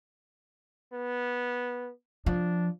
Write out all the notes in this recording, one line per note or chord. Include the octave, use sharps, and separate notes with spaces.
B3
F3 D4